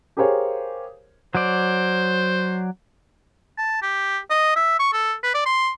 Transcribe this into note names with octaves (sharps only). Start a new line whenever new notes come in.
G4 G#4 A#4 C5 C#5 F5
F#3 C5 D5
A5
G4
D#5
E5
C#6
A4
B4
D5
C6